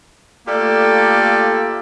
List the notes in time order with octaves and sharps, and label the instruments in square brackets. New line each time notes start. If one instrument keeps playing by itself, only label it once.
[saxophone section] A3 A#3 F4 G4 A4 D5